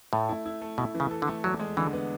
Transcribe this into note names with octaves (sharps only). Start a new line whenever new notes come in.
A2 A3
E4
E4
A3
B2 E4
E3
C#3
A4
D3
A3
E2 F#3
G#3
D3 E3
B3